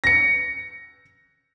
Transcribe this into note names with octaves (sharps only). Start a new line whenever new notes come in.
A#6 C#7